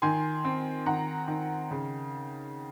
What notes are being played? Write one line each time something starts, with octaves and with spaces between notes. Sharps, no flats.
D#3 G#5 C6
C4
D#3 F#5 A#5
D#3
C#3